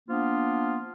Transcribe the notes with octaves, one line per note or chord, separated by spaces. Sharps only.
F3 A#3 B3 D4 F4